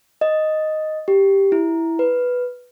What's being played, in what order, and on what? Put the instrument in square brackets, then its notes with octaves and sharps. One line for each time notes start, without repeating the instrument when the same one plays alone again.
[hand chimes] D#5
G4
E4
B4